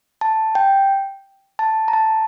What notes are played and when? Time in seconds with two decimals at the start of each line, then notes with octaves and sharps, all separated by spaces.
0.21 A5
0.55 G5
1.59 A5
1.88 A#5
1.93 A5